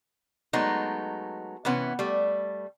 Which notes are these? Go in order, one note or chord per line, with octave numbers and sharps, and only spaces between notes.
F#3 G#3 A3 B3 D#4
C3 E3 B3 C#4
G3 A3